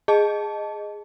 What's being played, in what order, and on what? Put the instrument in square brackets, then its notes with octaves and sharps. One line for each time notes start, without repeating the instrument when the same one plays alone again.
[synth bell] G#4 D#5 A5